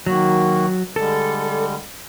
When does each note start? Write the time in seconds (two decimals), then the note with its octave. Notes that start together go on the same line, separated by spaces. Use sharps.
0.07 D#3 F#3 A#3 F#4
0.96 D3 G3 G#3 A4